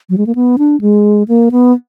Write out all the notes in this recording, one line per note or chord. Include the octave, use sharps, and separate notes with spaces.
F#3
G#3
A#3
B3
D4
G#3
A#3
B3